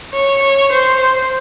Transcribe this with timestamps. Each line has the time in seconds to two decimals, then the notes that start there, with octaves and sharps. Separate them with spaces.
0.13 C#5
0.43 C#5
0.72 C5